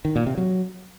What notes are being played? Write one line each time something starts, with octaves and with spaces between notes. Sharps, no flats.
D#3
A#2
C3
F#3